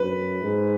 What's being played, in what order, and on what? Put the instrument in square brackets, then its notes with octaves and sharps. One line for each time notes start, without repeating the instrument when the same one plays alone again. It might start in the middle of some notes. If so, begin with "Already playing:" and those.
Already playing: [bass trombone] F#2 [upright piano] B4
[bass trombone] G#2